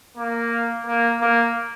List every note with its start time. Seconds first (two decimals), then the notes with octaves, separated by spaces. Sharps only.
0.17 A#3
0.86 A#3
1.21 A#3